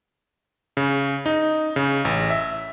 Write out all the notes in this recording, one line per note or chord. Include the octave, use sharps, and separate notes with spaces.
C#3
D#4
C#3
A1
E5